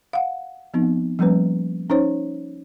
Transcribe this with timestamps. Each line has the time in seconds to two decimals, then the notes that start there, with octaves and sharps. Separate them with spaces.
0.13 F5 F#5
0.74 F3 B3 C4 D#4
1.19 F3 G3 A#3 C#4 B4
1.90 C#4 D#4 C5 C#5